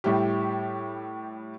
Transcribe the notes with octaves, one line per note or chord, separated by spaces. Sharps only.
A2 G3 E4 G4